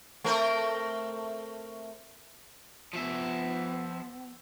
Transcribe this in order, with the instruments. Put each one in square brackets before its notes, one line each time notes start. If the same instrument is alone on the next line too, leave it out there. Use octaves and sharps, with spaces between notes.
[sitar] A3 C4 A#4
[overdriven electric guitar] F3 E5 [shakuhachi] B3